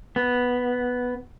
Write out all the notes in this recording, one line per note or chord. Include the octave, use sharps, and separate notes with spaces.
B3